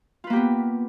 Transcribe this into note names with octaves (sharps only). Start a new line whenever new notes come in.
A#3 B3 F4 G4 B4